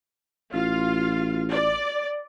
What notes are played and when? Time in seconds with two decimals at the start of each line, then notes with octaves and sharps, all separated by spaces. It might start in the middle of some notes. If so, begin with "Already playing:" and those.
0.53 A1 F4 F5
1.51 D5